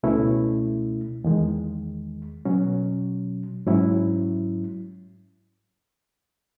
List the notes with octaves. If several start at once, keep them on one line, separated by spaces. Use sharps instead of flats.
C#2 B2 A3 C#4 E4
E2 D#3 G#3
B2 F#3 C#4
G#2 F#3 C#4 E4